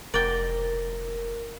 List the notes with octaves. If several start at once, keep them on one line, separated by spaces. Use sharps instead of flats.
F1 A#4 D5 G5